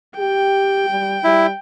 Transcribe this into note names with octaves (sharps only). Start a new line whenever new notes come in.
G4 G5
G3
G3 E4